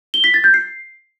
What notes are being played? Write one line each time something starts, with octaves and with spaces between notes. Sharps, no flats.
G7
B6
A6
G6
C7